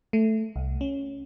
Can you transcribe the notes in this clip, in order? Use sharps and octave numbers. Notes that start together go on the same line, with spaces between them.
A3
C2
C#4